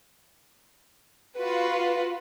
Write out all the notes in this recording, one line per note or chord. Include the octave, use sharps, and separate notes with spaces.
F4 F#4 B4